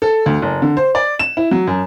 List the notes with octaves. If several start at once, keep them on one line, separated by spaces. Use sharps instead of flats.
A4
D2
F#1
D3
C5
D5
E7
E4
F#3
F#2